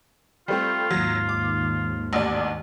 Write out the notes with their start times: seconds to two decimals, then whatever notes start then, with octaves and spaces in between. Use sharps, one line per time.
0.48 G3 A3 C4 F4
0.91 D#2 G#2 F#3
1.29 D6
2.13 A1 D2 D5